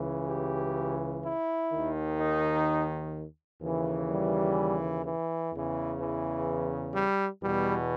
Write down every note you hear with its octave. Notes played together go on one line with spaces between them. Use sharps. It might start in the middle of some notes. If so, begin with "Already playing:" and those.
Already playing: C#2 C#3 E3
G4
E4
D#3
D#2
D#4
D#2 C#3 E3
G3
E3
E2 C#3 E3
E3
G3
E2 B2 G3